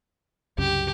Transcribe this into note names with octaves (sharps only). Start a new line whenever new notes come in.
C2 F#2 C#3 G4